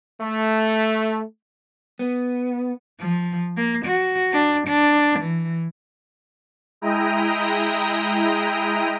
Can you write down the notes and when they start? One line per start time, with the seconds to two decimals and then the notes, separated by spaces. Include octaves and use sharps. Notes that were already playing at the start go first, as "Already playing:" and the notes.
0.20 A3
1.99 B3
3.00 F3
3.57 A#3
3.86 F#4
4.33 D4
4.68 D4
5.20 E3
6.81 G#3 E4 G5 A#5 D#6